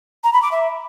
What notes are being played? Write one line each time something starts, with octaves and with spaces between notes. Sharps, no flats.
A#5
B5
D6
E5